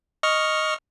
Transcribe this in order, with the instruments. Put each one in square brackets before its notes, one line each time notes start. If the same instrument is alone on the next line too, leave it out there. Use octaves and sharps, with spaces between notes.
[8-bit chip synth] D#5 C#6 F6